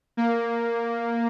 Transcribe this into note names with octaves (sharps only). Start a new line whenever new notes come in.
A#3